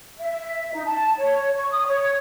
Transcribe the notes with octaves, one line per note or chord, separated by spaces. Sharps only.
E5
D#4
A5
C#5
C#6
D#6
C#5